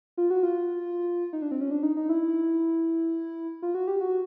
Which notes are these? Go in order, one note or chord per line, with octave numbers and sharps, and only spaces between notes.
F4
F#4
F4
D#4
D4
C4
C#4
D4
D#4
D#4
E4
F4
F#4
G4
F#4